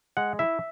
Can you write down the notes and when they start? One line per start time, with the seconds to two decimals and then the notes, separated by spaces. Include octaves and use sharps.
0.17 G#3 F#5
0.39 E4 E5